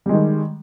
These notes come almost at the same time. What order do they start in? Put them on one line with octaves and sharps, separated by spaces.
G3 G#3 D#3